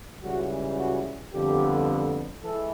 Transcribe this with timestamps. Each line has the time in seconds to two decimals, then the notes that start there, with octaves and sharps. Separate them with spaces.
0.22 C#2 C#3 E3 G3 F#4
0.77 F#4
1.32 F2 D3 G3 B3 G4
2.43 E3 G#3 A4